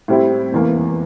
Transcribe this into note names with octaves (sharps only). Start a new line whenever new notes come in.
A2 G3 C4 E4
F1 E2 E3 A#3